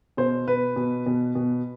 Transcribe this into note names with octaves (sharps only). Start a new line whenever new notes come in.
B2 C5
B2 B4
B2
B2
B2